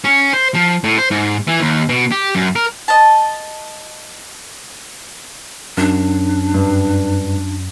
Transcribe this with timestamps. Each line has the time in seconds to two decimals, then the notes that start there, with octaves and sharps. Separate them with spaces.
0.04 C#4
0.33 C5
0.54 F3
0.84 A2
0.98 C5
1.11 G#2
1.47 E3
1.60 D#2
1.89 B2
2.11 G4
2.35 F#2
2.55 A#4
2.88 D#5 A5
5.77 F#2 D4
6.54 G2